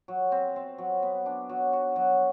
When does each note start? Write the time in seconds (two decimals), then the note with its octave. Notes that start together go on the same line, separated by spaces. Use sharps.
0.08 F#3
0.32 C4
0.56 C4
0.78 F#3
1.03 B3
1.26 D4
1.49 F#3
1.73 F#4
1.96 F#3